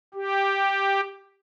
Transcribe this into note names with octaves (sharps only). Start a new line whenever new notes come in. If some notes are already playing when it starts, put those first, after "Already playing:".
G4